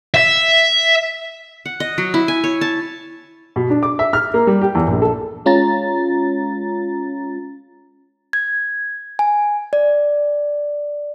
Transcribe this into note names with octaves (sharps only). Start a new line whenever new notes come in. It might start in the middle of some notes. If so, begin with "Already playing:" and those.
E5
F#5
D#5
F#3
E4
G#5
C#5
A5
B2
D4
D6
E5
F6
A#3
G3
G4
E2
A#1
A4
G#3 C#4 F4 A#5 A6
G#6
G#5
D5